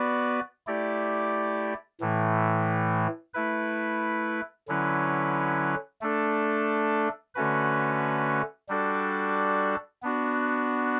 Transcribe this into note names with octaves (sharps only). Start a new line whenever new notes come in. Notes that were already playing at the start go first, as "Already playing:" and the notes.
Already playing: B3 F#4 B4 D5
A3 E4 G4 D5
A2 E3 A3
A3 E4 B4
D3 F#3 C#4 E4 B4
A3 D4 A4
D3 A3 C#4 F#4 B4
G3 D4 F#4 A4 D5
B3 D4 F#4